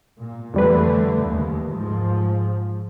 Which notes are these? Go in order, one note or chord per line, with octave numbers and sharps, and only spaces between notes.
A#2
F2 D3 E3 G3 A3 B4
D#2
G#2 F3